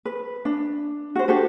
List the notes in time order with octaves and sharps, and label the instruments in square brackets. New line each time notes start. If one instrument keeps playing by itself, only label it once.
[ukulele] B4
D4
F#4 C5
D4 F#4 G4 A4